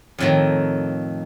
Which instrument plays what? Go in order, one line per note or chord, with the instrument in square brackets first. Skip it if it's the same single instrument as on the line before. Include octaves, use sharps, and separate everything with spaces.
[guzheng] F2 A2 D#3